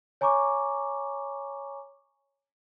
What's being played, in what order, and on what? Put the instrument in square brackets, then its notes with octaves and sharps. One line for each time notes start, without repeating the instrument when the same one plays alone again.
[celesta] C#5 G#5 A#5 C#6 D6